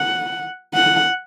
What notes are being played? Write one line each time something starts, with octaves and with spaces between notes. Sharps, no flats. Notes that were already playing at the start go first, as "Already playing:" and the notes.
Already playing: F#5
F#5